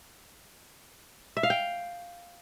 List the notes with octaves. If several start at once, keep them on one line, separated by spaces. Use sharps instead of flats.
E5
F5
G5